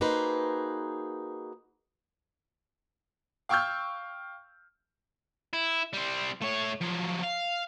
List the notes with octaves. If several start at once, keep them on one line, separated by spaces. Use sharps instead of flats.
A#3 D#4 F#4 G#4 B4 C5
F5 G5 C#6 E6 F6 G6
E4
G3 C4
A3 C#5
F3 F#3
F5